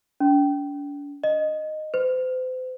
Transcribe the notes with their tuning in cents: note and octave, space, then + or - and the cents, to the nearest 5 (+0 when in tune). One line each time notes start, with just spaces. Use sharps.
D4 -40
D#5 -10
C5 -40